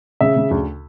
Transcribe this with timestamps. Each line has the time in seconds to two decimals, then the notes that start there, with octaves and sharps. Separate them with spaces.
0.21 C#3 E5
0.36 C#3
0.51 D2